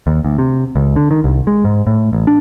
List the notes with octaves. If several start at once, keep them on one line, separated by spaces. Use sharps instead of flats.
D#2
D2
C3
C#2
D3
D#3
C2
G#3
G#2
A2
A1
D4